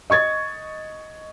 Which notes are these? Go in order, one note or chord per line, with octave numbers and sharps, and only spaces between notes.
D#5 C#6 G#6 A6